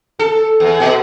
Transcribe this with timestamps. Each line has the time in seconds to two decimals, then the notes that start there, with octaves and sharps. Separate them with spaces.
0.19 A4
0.60 E2
0.80 B2